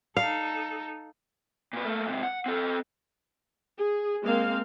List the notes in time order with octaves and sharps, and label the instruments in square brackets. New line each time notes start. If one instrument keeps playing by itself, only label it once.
[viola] D#4 A4 [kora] F5
[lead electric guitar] A#2 B4
A3 A#3
G#2 C3
F#5
C4 A4
[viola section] G#4
G#3 A#3 C4 F5